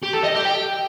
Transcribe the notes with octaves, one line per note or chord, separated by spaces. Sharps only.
G4
A4
D#5
G4
G5